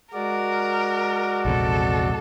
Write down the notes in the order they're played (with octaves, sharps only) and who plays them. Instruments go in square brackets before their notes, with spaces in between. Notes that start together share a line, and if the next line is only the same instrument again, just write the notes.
[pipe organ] G#3 F#4 D5 [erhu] A#4
[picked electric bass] A#1 E2 C3 [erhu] A4